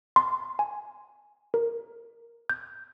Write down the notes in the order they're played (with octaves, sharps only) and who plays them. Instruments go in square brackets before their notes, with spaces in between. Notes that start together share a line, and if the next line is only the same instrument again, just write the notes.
[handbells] C6
G#5
A#4
G6